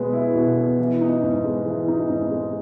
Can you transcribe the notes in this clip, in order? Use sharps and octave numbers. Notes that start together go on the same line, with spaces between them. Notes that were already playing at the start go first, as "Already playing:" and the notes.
Already playing: B2 G#3 B3
E4
B2
B3
E3
D#4
G#2
G#3
E3
D#4
G#2
G#3